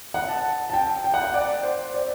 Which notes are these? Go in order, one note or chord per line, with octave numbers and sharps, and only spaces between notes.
F#5
A5
A5
G5
G5
F#5
F#5
D5
C5
D5